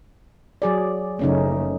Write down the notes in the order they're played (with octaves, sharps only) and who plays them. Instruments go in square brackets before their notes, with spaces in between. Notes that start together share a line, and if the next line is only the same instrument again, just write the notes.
[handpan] F#3 G#4 D5
[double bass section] F#1 C#3 F3 [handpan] A3 C#4 D#4